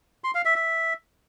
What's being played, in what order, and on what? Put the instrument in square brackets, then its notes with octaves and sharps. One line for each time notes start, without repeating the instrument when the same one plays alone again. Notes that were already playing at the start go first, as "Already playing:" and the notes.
[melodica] C6
F5
E5
E5